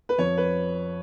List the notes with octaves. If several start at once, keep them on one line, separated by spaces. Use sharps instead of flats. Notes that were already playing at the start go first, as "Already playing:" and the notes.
B4
F2 F3 C#5
B4